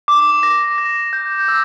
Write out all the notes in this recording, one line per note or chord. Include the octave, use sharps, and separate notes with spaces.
D6
A#6
A#6
G6
E6